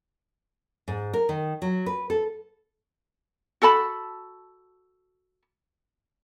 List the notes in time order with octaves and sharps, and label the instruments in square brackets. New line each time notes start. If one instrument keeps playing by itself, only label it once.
[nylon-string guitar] G#2
A#4
D#3
F#3
B4
A4
[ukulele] F#4 A4 A5 B5